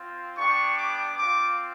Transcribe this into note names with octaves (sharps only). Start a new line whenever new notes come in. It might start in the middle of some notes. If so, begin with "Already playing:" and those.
Already playing: C4 F4
G3 B3 D4 G4 C#6
D6
C4 F4 D6